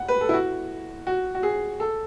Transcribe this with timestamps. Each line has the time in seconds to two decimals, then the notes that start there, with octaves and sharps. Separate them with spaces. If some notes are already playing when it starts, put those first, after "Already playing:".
Already playing: F#5
0.08 B4
0.21 A4
0.29 E4
0.33 F#4
1.07 F#4
1.35 F#4
1.43 G#4
1.80 A4